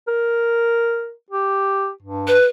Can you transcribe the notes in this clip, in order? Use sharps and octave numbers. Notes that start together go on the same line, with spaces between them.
A#4
G4
G2
B4